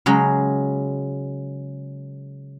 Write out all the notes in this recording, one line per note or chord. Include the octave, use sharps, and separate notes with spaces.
C#3 F#3 G#3